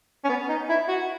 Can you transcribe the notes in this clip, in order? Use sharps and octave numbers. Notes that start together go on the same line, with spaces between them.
C#4
B3
D#4
E4
F#4